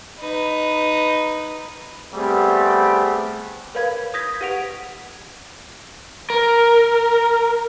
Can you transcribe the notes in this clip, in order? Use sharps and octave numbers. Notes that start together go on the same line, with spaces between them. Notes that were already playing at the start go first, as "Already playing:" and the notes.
D#4 B4
G3 A3 B3 C4 G4 G#4
A#4 B4 C#5 F5 B5 G#6
D#6 G6 G#6 A#6 B6
G4 B4 F#5 B6 D7 F7
A#4